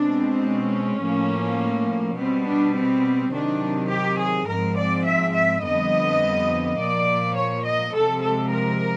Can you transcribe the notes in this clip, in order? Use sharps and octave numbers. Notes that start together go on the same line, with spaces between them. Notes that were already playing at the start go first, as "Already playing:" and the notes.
Already playing: B2 G#3 C4 D4
C#4
A2 F3 A#3
B2 G3 B3 C4
D4
C4
C3 D#3 F#3 D4
G4
G#4
G#2 F3 G#3 C4 A#4
D5
E5
E5
F2 D3 G3 B3 D#5
A#2 F3 A#3 D5
C#5
D#5
C3 F3 G#3 A4
A4
A#4